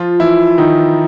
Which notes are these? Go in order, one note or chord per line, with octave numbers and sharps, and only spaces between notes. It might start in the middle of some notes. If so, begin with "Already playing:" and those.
Already playing: F3 F4
E3 E4
D#3 D#4